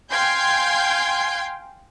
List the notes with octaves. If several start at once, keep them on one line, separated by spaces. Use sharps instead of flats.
F5 G5 G#5 C6 G6 G#6